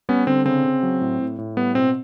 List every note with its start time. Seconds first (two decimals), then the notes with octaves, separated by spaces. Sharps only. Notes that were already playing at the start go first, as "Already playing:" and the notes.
0.09 G3 B3 C#4
0.27 D3 C4
0.45 C#3 C4
0.64 C#3
0.83 F#3
1.01 A2
1.20 A2
1.38 A2
1.57 G3 B3
1.75 B2 C4